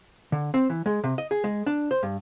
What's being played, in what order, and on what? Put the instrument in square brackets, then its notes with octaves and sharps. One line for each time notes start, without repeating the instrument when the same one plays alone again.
[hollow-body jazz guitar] D3
C4
E3
G#3
C3
D#5
G#4
G#3
D4
C5
G2